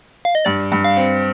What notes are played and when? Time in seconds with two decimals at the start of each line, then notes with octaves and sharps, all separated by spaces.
0.25 F5
0.35 D#5
0.45 G2 D5
0.72 G2
0.84 F5
0.97 C4